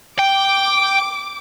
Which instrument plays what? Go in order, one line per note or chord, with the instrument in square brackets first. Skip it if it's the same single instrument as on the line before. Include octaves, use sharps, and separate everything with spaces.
[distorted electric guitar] G5 [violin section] D6